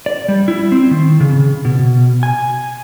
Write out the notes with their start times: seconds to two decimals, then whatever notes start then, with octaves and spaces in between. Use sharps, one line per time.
0.06 D5
0.28 G3
0.48 E4
0.72 C4
0.91 D#3
1.20 C#3
1.65 B2
2.23 G#5